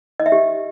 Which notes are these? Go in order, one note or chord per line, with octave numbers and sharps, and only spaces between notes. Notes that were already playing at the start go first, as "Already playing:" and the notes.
D#5
E5
G4